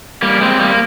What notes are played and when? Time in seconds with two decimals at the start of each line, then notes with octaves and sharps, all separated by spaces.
0.22 G3 A#3
0.41 G#3 C4
0.60 G3 A#3